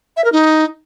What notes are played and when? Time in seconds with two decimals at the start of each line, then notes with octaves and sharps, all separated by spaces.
0.17 E5
0.24 A#4
0.32 D#4